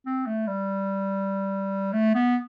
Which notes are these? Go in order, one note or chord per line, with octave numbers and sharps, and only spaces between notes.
C4
A3
G3
A3
B3